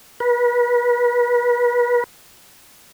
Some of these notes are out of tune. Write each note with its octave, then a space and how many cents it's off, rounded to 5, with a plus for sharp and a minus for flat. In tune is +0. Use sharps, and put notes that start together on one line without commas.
B4 -35